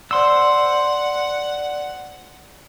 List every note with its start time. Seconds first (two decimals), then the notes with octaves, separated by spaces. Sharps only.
0.11 C5 D5 F#5 C6 E6